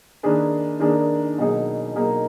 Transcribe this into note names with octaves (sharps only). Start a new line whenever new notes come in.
D#3 A#3 D4 G#4 B4
D#3 A#3 D4 G#4 B4
B2 F#3 A#3 D#4 G#4
B2 F#3 A#3 D#4 G#4